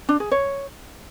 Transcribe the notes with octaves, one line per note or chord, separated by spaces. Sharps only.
D4
G#4
C#5